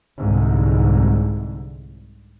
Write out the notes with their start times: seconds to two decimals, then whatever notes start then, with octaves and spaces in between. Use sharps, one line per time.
0.18 C2 G#2 D3